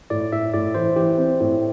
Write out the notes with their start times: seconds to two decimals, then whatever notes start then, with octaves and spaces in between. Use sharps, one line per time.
0.10 A2 D5
0.32 A2 E5
0.53 A2 D5
0.75 E3 C5
0.96 E3 G4
1.18 C4
1.40 A2